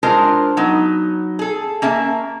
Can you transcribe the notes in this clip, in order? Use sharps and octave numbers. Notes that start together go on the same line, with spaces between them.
G#3 D4 F4 A#4 C5
F#3 B3 D#4
G#4 A4
A#3 C#4 E5 A5